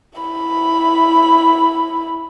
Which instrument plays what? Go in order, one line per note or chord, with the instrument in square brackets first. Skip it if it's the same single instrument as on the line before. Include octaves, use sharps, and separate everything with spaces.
[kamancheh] E4 B5